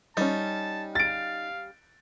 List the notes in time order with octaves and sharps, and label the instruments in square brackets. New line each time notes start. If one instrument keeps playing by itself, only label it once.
[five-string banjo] G3 C#4 [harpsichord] D#4 [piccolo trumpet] A5
[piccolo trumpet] F5 [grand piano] A6 D7